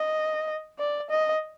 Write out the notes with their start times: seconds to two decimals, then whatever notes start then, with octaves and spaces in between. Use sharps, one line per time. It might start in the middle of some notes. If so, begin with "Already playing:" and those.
Already playing: D#5
0.78 D5
1.10 D#5